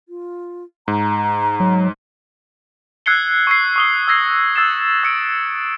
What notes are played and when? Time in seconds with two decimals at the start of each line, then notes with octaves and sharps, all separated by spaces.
0.09 F4
0.88 G#2 A#5
1.60 F#3
3.06 E6 F#6 G#6 C7 C#7 G7
3.47 C#6 E6 C7
3.76 C#6 D#6 G7
4.08 E6 G#6 A#6 C7
4.56 E6 A6 C7 E7
5.04 E6 C#7 D7